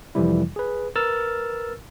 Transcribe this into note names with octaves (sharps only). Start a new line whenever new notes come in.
F2 C3 E3 F3 G3 E4
G#4 B4
A#4 B4 E6 F6 A6